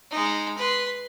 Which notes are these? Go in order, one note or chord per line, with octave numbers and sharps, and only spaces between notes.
G#3 D#4
B4 C6